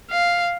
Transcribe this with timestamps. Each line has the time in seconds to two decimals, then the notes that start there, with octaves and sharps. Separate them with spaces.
0.11 F5